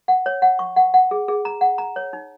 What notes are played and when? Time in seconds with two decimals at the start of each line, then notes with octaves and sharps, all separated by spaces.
0.08 F#5
0.26 C#5
0.42 F#5
0.59 C#6
0.76 F#5
0.94 F#5
1.11 G#4
1.28 G#4
1.45 A#5
1.61 F#5
1.78 A#5
1.96 C#5
2.13 D#4